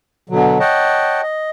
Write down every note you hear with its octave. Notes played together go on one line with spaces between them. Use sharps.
B2 D3 F#3
C#5 D#5 F#5 G5 A5
D#5